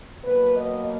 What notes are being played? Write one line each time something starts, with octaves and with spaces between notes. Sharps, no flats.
B2 F#3 A#3 B4
D#5